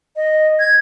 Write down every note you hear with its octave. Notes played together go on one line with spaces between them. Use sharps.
D#5
G#6